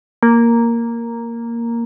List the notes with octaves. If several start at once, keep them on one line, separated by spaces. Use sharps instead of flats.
A#3